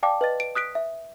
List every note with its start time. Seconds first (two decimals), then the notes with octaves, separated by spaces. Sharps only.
0.03 D5 F5 G5 A5 D6
0.21 B4 D#5 A6
0.40 D7
0.55 D#6 F#6 B6 D7
0.75 E5